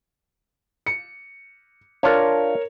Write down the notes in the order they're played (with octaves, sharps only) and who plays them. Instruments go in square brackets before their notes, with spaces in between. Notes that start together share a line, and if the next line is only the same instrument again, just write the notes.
[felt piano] C#7
[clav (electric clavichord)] D4 F4 [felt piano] A#4 C#5